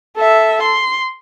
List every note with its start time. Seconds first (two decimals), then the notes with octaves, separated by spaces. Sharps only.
0.17 A4 E5
0.63 C6